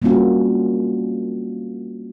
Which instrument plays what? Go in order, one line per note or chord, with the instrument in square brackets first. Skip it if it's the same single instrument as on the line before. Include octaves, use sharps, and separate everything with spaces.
[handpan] G3 A#3 C4 C#4 F4 F#4